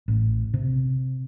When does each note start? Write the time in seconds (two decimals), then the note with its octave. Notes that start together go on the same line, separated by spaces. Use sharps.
0.08 A1
0.54 C3